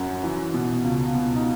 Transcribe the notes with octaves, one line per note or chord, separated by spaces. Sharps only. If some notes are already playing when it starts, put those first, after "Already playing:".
Already playing: F#2 F#4
E3
B2
C#2
B2
D#4